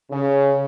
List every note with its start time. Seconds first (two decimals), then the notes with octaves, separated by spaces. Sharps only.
0.11 C#3